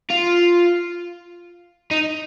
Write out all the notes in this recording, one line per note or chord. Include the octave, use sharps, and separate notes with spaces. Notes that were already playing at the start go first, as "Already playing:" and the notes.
F4
D#4